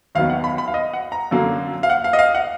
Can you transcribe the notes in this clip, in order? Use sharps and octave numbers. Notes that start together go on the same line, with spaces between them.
D#2 D#3 F#3 B3 F5
F#5
B5
B5
F5
D#5
F#5
A#5
F#2 D3 F#3 A#3
F5
F#5
F5
D#5
F5
F#5